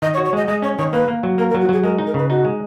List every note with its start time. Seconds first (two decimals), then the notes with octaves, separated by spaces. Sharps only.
0.02 D#3 D#5
0.14 C#5
0.17 F#4
0.25 C#5
0.33 G#3 D#5
0.48 G#3 D#5
0.62 C#4 C#5
0.78 D#3 C#5
0.93 A#3 B4
1.08 A#3
1.23 F#3
1.38 A#3 A#4
1.50 A#4
1.54 F#3
1.61 F#4
1.69 F#3 G#4
1.84 G#3 A#4
1.98 D#4
2.07 A#4
2.14 C#3 B4
2.30 D#4 F#4
2.45 G#3